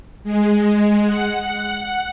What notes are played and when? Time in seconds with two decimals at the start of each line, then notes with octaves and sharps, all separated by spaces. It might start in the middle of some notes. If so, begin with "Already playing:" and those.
0.24 G#3
1.06 F#5